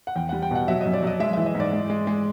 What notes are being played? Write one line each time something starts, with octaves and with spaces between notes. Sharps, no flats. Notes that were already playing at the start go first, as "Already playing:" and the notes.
F#5
E2 G5
G3 F#5
G5
B2 F#5
F#3 E5
F#2 D#5
D5
F#3 D#5
G#3 E5
E3 E5
D#5
G#2
D5
G#3
G#3
G#3